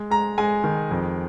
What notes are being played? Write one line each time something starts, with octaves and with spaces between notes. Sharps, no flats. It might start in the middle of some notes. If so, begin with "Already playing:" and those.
Already playing: G#3
G#3 A#5
G#3 G#5
D#3
F2